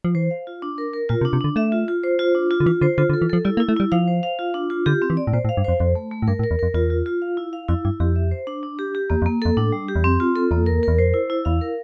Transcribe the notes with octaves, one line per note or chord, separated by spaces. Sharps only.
F3
E3 C5
F5
F4
D4
A#4
A#4
A#2 F4
C3
D4
C3
D3 D4
A3 E5
F4
F4
C5
F4
D4
F4
D3
E3 F4
D3 C5
D3 F4
D3
A4
E3
F3 A4
G3 E4
A#3
E4
A3
G3 E4
F3 F5
C5
F5
F4
D4
F4
D3 G4
C4
E3
D5
A2
A#2 C5
A2
F5
G2
F2 C5
F2 A4
A3
A3
A2
G2 A#4
A2
A#4
E2
F2 A#4
E2 F4
F4
F4
F5
E4
F5
F2 E4
G2 E4
F2 G4
E5
C5
D4
D4
G4
G4
E2 A#3
F2
A#3
F2 A4
A2 D4
G3
G4
E2
F2 C4
F4
A4
E2 A#3
F2 A#4
E2
E2 A#4
F2 C5
E4
E4
E2 F5
A#4